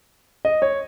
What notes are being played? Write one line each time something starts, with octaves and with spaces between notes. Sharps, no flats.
D#5
C#5